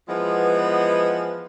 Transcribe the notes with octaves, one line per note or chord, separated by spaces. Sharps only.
E3 F3 G#3 B3